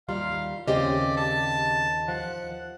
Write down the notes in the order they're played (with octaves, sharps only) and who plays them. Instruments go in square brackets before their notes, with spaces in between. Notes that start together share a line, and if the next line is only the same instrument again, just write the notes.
[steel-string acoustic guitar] D#2 G3 A#5 [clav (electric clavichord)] F4 [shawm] F5
[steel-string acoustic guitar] D#2 G4 D#5 [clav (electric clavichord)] C#3 C4 [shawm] D5
[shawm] A5
[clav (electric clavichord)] F3 [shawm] F#5